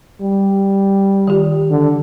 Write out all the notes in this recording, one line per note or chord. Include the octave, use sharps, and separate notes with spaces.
G3
D#3 F4 G4
D3